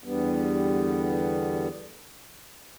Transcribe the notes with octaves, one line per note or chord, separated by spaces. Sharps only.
E2 D3 G3 B3